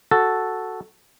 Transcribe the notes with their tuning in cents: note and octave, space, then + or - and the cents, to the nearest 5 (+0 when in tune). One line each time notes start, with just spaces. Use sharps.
F#4 +0 A4 +0